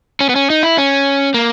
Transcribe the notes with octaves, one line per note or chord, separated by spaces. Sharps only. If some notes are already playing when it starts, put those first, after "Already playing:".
C#4
B3
C#4
D#4
E4
C#4
A#3